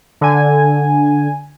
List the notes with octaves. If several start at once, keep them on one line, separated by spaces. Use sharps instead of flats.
D3 G#5